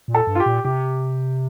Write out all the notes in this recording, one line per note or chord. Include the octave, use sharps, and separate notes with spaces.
A#2
A4
G2
F4
G4
A#2
C3 G4